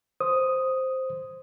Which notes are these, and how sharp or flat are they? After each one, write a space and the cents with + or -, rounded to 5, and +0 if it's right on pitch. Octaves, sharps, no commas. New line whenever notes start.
C5 +0 D#6 +0